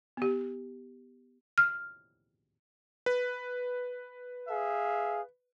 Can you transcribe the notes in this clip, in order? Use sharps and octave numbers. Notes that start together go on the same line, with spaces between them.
B3 G4
F6
B4
G#4 E5 F5